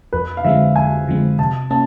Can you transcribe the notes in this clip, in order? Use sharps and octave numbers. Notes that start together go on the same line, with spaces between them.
F2 B4
F5
D3 F3 G#3 C4 E5
F2 G#5
D3 F3 G#3 C4
C3 A5
A#3 C#4 A5